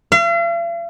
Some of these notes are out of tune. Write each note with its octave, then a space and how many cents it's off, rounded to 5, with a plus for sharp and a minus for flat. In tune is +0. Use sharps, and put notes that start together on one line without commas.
F5 -45